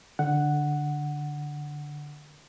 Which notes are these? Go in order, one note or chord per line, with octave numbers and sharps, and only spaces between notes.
D3 F#5